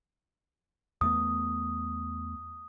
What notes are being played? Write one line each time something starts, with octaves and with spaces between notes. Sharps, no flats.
E2 A3 B3 D#6